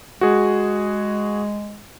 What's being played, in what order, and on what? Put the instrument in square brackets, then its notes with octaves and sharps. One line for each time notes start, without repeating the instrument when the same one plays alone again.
[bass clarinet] G#3 [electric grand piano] F#4 G#4